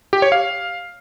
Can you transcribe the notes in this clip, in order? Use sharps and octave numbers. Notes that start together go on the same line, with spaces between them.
G4
C#5
F5